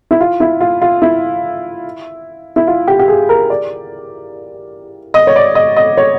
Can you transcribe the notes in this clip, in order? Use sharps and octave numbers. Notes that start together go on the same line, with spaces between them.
E4
F4
E4
F4
F4
E4
E4
F4
G4
G4
G#4
A#4
D5
D#5
C#5
D5
D#5
D#5
C#5